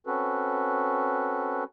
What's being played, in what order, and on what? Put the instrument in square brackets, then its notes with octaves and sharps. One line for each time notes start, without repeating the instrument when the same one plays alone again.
[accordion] C4 C#4 F#4 A4 B4